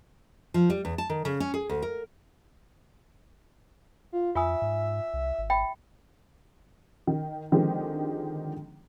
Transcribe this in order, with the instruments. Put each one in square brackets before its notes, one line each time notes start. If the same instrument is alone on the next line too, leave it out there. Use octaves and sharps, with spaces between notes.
[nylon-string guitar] F3
G3
E2
A5
D#3
C#3
C#4
G#4
D2
A#4
[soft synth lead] F4
[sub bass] F2 [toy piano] F4 G#5 D#6 [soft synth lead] E5
[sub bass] G#2
C2
G#1
[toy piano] E5 G5 B5
[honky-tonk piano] D#3
D3 D#3 F3 G#3 C4 G4